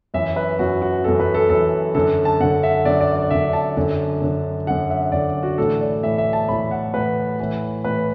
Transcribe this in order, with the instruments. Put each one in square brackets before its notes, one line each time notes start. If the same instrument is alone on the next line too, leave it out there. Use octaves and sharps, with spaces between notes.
[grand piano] F#2 E3 E5
B4
F#2 E3 F#4
F#4
F#2 E3 A4
B4
A4
F#2 E3 A4
F#2 D3 A4
A5
F#2 D3 F#5
E5
F#2 D3 D5
D5
D5
F#2 D3 E5
A5
F#2 D3
F#2 D3
F#2 D3 F#5
E5
F#2 D3 D5
F#4
A2 E3 A4
D5
A2 E3 E5
E5
A5
A2 E3 B5
F#5
A2 E3 B4
A2 E3
A2 E3 B4